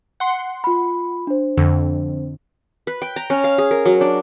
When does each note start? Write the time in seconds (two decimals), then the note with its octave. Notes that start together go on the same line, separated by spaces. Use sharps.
0.20 F#5 C6
0.64 F4 B5
1.27 D4 C5
1.57 F2 D3
2.87 B4
3.02 G5
3.16 A#5
3.30 C#4
3.44 F5
3.58 G#4
3.71 A#4
3.86 F#3
4.01 D4